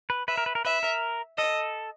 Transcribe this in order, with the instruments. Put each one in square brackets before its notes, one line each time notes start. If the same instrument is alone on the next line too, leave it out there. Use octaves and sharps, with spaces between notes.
[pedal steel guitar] B4
[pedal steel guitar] B4 [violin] E5
[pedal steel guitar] A#4
B4
A#4
[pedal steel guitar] B4 [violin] E5
[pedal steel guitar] A#4
[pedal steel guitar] A4 [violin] D#5